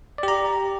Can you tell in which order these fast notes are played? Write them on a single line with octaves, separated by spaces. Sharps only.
D5 G4 A#5